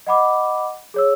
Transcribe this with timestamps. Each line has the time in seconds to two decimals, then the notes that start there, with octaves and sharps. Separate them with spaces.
0.07 D#5 F#5 B5 D6
0.94 G#4 C#5 E6